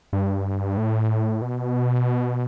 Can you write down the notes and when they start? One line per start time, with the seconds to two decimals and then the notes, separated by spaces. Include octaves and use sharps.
0.13 G2
0.77 A2
1.42 B2